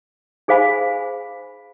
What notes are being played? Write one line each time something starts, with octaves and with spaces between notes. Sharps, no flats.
D#4 G#4 C5 F5 G#5 B5